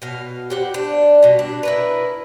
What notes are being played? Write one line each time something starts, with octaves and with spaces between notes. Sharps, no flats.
B2 F5
G4 C5 F#5
D4
B2 G3
D4
E4 A#4 B4